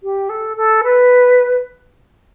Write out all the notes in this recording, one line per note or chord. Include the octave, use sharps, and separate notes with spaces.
G4
A4
A4
B4